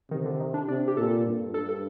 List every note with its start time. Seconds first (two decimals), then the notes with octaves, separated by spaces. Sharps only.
0.11 C3 D#3
0.25 D3
0.40 D#3
0.54 D4
0.68 C3 D4
0.88 G4
0.97 A#2 A4
1.26 G2
1.54 G2 A4
1.69 A4